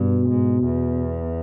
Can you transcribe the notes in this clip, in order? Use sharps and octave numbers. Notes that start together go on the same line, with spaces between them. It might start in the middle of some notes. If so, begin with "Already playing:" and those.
Already playing: G2 B2
G#2
E2